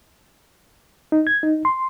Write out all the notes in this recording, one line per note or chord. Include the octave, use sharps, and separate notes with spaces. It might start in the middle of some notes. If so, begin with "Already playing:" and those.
D#4
G#6
D#4
C6